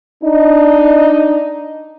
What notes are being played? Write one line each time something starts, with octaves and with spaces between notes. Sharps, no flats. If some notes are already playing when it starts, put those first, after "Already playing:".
D4 D#4